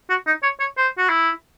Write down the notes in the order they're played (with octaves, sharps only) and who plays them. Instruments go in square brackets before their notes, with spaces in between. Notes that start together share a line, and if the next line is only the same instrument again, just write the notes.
[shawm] F#4
D#4
C#5
C#5
C5
F#4
E4